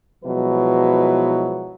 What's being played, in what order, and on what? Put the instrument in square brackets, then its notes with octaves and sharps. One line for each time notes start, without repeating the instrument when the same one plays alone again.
[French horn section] B2 F3 F#3 G#3 E4 B4